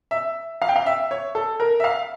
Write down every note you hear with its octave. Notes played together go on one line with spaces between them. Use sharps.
E5
F5
G5
F5
E5
C#5
A4
A#4
E5
F5